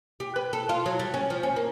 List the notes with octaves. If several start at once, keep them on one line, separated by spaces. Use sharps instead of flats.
G4
B4
A4
F4
F#3
G3
C#4
F3
C#4
A#3